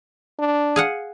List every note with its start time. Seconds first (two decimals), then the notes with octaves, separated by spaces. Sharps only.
0.39 D4
0.76 G#4 F5 F#5